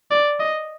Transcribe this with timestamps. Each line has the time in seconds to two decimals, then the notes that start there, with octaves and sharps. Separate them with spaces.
0.11 D5
0.40 D#5